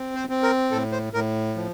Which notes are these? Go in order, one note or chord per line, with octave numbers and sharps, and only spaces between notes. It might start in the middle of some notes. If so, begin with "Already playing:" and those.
Already playing: C4
C5
C4
A#4
A2 A4
C5
A2 A#4
F3